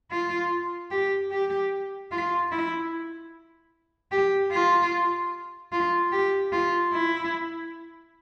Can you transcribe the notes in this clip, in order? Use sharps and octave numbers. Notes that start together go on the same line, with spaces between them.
F4
G4
G4
F4
E4
G4
F4
F4
G4
F4
E4